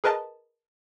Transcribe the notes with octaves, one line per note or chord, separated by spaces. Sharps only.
G#4 A#4 B4 D#5 A5